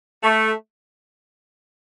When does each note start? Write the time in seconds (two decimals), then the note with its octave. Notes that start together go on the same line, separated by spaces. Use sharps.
0.24 A3